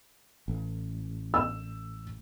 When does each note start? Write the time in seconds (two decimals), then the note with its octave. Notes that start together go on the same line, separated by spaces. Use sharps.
0.48 A1
1.34 E6